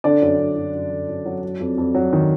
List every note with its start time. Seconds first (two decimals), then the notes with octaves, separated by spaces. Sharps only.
0.04 D3 D4 D5
0.22 F#2
0.38 F#2
0.56 F#2
0.74 F#2
0.91 D3
1.08 F#2
1.25 F#3
1.43 F#3
1.60 F2
1.78 F2
1.95 F#3
2.13 D#3